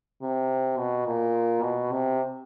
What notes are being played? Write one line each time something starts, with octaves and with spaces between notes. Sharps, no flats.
C3
B2
A#2
B2
C3